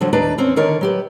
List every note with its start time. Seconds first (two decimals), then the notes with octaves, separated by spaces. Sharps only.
0.01 D3 F3 F#3
0.13 D#2 D4 B4 D5 A#5
0.38 E2 C4 C#4
0.56 D3 D#3 A#4 C#5 D5
0.81 F#3 G4 B4